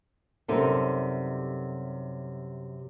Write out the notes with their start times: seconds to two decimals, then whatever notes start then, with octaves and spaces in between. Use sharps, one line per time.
0.48 F#2 C3 G3 D#4 A4 A#4